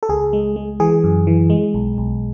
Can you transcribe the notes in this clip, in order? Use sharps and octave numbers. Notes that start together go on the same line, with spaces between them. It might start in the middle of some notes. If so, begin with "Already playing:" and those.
A4
C#2 G#4
G#3
G#3
E3 G#4
F#2
E3
G#3
B1
B1